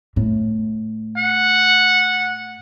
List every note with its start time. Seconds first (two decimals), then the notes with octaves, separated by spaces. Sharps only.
0.16 A2
1.17 F#5